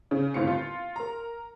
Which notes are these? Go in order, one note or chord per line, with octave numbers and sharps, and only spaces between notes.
C#3
G1 D#2 A2 C4 F5 C#7
F4
A#4 A#5